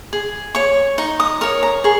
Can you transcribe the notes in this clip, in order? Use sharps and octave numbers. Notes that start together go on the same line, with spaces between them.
G#4
C#5 C#6
D#4 C#6
D#6
A#4 C#5 C#6
A#5
G#4 C#6